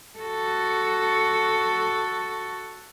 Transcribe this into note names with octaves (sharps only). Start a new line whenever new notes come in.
F#4 A4